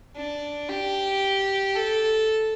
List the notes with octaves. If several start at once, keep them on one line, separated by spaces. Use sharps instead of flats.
D4
G4
A4